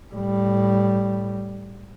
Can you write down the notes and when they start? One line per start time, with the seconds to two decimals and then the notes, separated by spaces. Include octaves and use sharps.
0.13 A2 G3